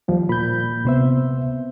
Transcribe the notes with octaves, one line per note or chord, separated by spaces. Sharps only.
D#2 F3 G3
A#2 B5 G6
C#2 C3 B3 C5 E5